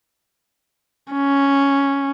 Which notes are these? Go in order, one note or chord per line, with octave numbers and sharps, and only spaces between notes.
C#4